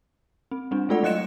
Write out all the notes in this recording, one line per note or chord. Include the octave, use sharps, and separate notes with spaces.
C4
G3 C4 D4
G#3 A3 F4 A4 D5 F#5
F#3 G3 D#5 F#6 C#7 E7